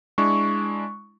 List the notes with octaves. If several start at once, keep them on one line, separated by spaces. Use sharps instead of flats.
G#3 D4 E4 C#6